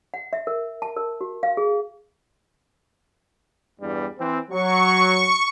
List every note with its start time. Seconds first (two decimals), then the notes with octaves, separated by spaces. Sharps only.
0.14 F#5
0.33 E5
0.47 A#4
0.82 A5
0.97 A#4
1.21 F#4
1.43 F5
1.57 G#4
3.80 E2 G2 G3
4.19 E3 C4
4.51 F#3 C#6